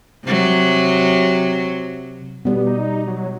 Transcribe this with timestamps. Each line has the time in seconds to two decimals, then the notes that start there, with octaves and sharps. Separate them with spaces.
0.25 C3 F#3
2.45 B2 G3 B3
2.67 D#4
3.08 F#3